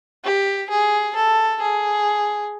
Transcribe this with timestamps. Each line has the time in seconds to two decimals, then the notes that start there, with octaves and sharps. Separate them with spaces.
0.24 G4
0.70 G#4
1.15 A4
1.61 G#4